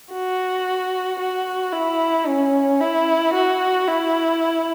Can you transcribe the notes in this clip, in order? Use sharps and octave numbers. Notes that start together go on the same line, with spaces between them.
F#4
F#4
E4
C#4
E4
F#4
E4